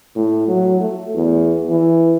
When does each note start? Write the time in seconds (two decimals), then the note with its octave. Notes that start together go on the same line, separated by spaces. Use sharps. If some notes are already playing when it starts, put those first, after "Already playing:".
0.15 A2
0.48 F#3
0.80 A3
1.14 E2
1.70 E3